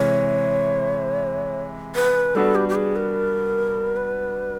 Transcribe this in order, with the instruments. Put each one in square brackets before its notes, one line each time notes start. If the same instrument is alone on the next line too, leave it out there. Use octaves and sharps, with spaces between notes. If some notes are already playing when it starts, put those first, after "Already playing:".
Already playing: [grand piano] C3 E3 G#3 [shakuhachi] C#5
[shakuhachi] B4
[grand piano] G3 B3 D4 F#4 [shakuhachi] A4
[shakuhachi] G4
G4
G#4
A#4
B4